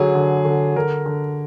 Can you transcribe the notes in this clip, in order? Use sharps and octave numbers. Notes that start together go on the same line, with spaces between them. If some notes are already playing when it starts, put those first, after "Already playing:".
Already playing: D3 F#3 G#4
D3
D3
D3 A#4
D3